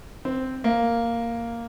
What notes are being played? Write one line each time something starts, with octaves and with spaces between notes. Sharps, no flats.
C4
A#3